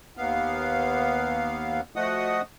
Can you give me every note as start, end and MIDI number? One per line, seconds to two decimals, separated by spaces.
0.17 1.81 39
0.17 1.81 59
0.17 1.81 77
1.96 2.42 53
1.96 2.42 57
1.96 2.42 66
1.96 2.42 75
1.96 2.42 78
1.96 2.42 87